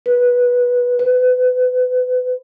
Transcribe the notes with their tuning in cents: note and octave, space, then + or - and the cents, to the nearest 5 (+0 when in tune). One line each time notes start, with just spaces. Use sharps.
B4 -15
B4 +30